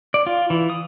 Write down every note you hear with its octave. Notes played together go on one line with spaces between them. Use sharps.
D5
F4
E3
D#6